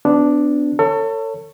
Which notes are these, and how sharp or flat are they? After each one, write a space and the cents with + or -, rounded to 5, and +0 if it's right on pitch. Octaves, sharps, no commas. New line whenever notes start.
B3 +35 D4 +0 F#4 +0
A4 +35 C#5 +0